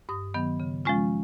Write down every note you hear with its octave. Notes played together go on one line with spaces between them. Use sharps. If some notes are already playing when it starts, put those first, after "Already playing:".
G2 D#6
D#3 F#3 B3
C#3
F3 G#3 C#4 F4